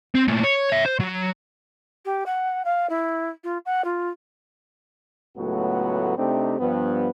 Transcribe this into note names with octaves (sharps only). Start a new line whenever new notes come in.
C4
A#2 A3
C#5
C#5 E5
C5
F#3
G4
F#5
F5
E4
F4
F#5
F4
C#2 A2 F#3 A3 B3 F#4
C3 A3 C4 D4 D#4 G4
G2 F3 B3